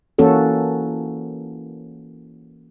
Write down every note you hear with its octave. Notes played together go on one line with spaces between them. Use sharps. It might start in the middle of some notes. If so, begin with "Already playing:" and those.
E3 A#3 C#4 F#4 A4